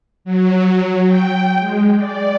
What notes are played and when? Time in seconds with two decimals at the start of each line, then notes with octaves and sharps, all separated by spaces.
0.25 F#3
1.07 G5
1.60 G#3
1.96 D5